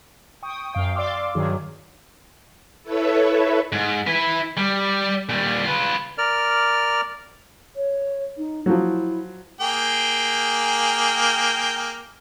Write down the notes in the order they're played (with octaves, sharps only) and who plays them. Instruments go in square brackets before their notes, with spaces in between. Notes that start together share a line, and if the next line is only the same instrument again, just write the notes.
[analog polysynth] G5 C#6 D#6
F#2 F5 G5
D5 F5 C6 D6 E6
G2 D#3 F#3 G#4
[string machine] E4 A4 B4 C#5 E5
[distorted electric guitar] G#2
E4 B4
G3
A#2 G3
F4 B4
[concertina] A#4 D5 F6
[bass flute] C#5
D#4
[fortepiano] F3 F#3 [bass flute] E4
[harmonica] A#3 G#4 G5